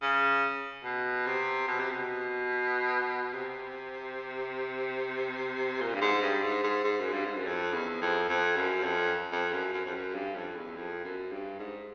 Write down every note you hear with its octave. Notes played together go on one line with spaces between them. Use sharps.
C#3
B2
C3
B2
C3
B2
C3
A#2
G2
G#2
G2
G#2
G#2
G#2
F#2
G2
G#2
F#2
F2
E2
F2
F2
F#2
F2
F2
F#2
F#2
F2
F#2
G2
F2
E2
F2
F#2
G2
G#2